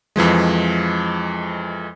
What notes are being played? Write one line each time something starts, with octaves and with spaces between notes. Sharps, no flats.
F2 E3 F3 G#3